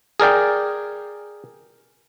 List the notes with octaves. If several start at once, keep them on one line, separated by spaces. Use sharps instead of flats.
G#4 A#4 D5 G5